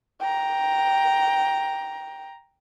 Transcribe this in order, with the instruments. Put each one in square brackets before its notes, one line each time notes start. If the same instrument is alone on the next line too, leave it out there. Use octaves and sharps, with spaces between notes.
[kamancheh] G5 A#5